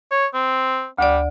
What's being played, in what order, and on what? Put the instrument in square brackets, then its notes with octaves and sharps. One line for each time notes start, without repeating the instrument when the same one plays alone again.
[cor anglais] C#5
C4
[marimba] D2 D5 [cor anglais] G3